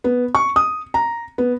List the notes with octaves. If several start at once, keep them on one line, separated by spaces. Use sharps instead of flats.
B3
C#6
D#6
A#5
B3